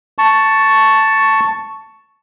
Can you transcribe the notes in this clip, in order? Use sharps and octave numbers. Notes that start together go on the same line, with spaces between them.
A5 C#6